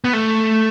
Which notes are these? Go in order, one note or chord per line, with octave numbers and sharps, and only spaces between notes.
B3
A3